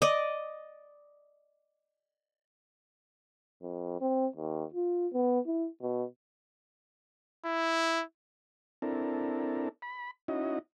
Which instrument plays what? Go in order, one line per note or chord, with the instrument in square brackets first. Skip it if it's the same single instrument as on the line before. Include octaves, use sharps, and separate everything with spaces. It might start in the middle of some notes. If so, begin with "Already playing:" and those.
[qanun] D5 D#5
[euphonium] F2
C4
D#2
F4
B3
E4
B2
[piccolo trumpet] E4
[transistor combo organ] C4 D4 E4 A4 A#4
B5
C#4 D#4 E4 F#4 D#5